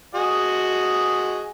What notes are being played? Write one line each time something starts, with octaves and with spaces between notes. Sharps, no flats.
F#4 G#4 D#5